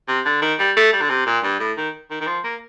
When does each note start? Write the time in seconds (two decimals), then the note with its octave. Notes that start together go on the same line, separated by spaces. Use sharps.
0.08 C3
0.25 D3
0.42 D#3
0.59 G3
0.76 A3
0.93 G3
1.01 D3
1.10 C3
1.27 A#2
1.43 G2
1.60 A2
1.77 D#3
2.11 D#3
2.21 D#3
2.27 F3
2.44 A#3